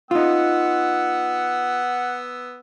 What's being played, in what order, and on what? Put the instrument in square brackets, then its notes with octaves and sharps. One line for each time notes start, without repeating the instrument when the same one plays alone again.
[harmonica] B3 E6 [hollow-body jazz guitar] D#4 F4 [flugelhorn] F#5